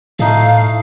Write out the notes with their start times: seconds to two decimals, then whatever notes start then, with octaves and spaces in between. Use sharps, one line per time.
0.19 A2 A3 D#4 A4 F5